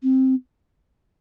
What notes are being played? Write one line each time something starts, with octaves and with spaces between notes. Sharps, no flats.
C4